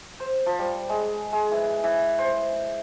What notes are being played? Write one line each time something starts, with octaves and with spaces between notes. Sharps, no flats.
C5
F3
G3
G#3
G#3
E3
E3
C5